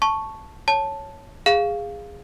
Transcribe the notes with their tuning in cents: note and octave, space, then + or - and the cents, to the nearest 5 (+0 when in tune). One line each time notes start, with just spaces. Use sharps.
A5 +0 C#6 +0
C#5 +0 A5 +0
G#4 -15 F5 +0